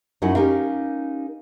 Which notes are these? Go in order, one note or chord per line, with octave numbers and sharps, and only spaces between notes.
F#2 F#3 D#4 E4 F#5 G#5
C#4 D#4 G4 A#4 F5